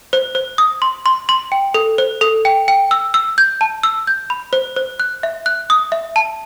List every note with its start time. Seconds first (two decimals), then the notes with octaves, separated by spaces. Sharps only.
0.13 C5
0.35 C5
0.58 D#6
0.82 C6
1.06 C6
1.29 C6
1.52 G5
1.74 A4
1.98 C5
2.21 A4
2.45 G5
2.68 G5
2.91 E6
3.14 E6
3.38 G6
3.61 A5
3.83 E6
4.07 G6
4.30 B5
4.53 C5
4.76 C5
5.00 F#6
5.23 E5
5.46 F#6
5.70 D#6
5.92 E5
6.16 A5